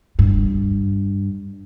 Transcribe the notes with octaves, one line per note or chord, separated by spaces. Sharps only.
G2